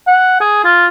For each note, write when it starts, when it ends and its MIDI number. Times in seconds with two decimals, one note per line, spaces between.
0.07 0.40 78
0.41 0.60 68
0.64 0.87 65